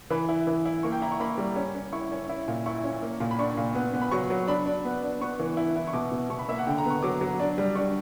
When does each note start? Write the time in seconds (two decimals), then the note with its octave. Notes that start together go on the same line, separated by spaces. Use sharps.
0.10 E3 B5
0.29 E4
0.47 E3
0.65 E4
0.83 A#3 C#6
0.92 G5
1.02 E4 A#5
1.12 C#6
1.20 A#3 B5
1.38 G3
1.56 C#4
1.75 C#4
1.92 E4 C#6
2.12 C#4
2.29 E4
2.48 A#2
2.66 E4 C#6
2.84 C#4
3.02 A#3
3.20 A#2
3.31 B5
3.38 D4 C#6
3.57 A#2
3.75 B3
3.93 B3
4.01 B5
4.11 F#3 C#6
4.30 F#3
4.48 D4 B5
4.66 D4
4.85 B3
5.03 D4
5.21 B3 C#6
5.39 E3
5.57 E4
5.76 E4
5.87 C#6
5.93 B2 D6
6.12 B2
6.30 B2 C#6
6.39 B5
6.49 A#3 E5
6.58 F#5
6.67 D3 G5
6.78 A#5
6.85 B3
6.90 C#6
7.03 F#3 D6
7.21 F#3
7.40 D4
7.58 G3
7.75 D4 C#6